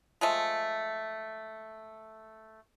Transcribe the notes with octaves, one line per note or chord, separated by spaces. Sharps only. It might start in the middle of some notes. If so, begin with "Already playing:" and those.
F3 G#3 A3